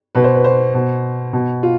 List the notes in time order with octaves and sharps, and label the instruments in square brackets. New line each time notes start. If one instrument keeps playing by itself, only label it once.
[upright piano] B2 B4
C5
B4
C5
B2
B2
F4